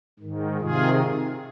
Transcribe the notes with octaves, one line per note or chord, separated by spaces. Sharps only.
G#2 D#3
C3 D#3 F4 G#4